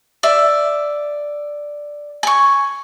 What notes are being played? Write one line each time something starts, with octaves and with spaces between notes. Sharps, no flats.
D5 E5
G#5 C#6